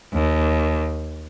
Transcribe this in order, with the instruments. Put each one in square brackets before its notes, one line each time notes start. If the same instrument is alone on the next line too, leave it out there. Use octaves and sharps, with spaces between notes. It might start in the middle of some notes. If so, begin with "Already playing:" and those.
[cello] D#2